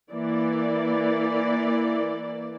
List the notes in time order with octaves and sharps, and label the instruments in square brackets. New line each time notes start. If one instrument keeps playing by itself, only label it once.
[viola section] E3 A#3 D5